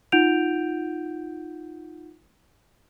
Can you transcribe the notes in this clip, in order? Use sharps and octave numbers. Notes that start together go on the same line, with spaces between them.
D#4 F4 F#5 G6 D7 F7